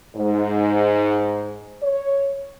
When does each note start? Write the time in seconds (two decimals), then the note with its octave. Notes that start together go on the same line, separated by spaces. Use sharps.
0.16 G#2
1.82 C#5